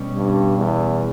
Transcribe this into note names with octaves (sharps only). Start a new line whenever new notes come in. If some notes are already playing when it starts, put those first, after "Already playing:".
Already playing: B2 G3 C#4
G2
E2